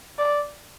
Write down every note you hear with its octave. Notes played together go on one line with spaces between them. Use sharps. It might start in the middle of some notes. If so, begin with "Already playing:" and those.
D5